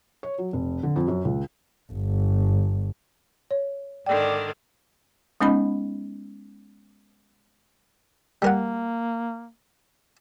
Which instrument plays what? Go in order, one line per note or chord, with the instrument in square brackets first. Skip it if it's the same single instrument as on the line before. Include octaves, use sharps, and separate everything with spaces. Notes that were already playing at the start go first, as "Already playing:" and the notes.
[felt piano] C#5
F#3
F1
D3
F2
F#2
C#2
[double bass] G1
[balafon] C#5
[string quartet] G#2 D3 D#3 [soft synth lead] D5 [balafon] G5
[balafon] G#3 B3 C#4 D#4 D#5 B5
[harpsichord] G3 A#4 F#5 [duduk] A#3